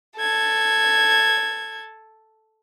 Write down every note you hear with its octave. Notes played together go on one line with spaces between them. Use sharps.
A4 G#6